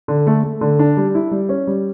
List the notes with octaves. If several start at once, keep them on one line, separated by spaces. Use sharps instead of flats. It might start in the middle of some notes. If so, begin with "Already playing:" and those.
D3
A3
A3
D3
D4
G3
E4
G3
C#4
G3